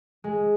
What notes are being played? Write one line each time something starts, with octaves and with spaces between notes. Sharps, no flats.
G#3